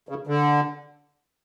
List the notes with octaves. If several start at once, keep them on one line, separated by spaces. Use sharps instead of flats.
C#3
D3